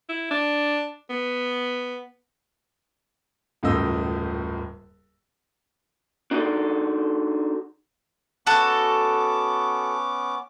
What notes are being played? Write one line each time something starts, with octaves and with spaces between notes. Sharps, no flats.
E4
D4
B3
D#1 C#2 F#2 A2 D#5 E6
D4 D#4 F#4 G#4 A4 D5
B3 C#4 F#4 A4 D6